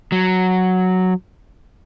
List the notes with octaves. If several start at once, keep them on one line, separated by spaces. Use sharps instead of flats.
F#3